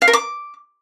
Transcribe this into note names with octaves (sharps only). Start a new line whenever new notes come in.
F5
A#4
D6